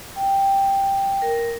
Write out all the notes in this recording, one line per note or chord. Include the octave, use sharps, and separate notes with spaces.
G5
A#4